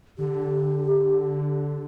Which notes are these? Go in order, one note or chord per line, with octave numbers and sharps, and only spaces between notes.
D3 G4